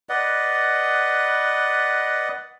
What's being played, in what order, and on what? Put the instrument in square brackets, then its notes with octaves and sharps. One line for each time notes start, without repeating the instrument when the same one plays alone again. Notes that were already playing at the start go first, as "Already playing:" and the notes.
[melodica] B4 D5 D#5 F#5